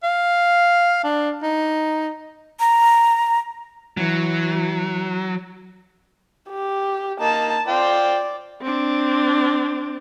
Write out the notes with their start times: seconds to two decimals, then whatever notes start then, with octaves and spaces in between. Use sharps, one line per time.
0.03 F5
1.04 D4
1.43 D#4
2.60 A#5
3.97 E3 F#3
6.50 G4
7.20 A#3 D#4 A5
7.68 F4 C5 D5 G5
8.62 C4 D4